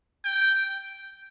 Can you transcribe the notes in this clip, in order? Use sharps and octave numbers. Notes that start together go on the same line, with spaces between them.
G5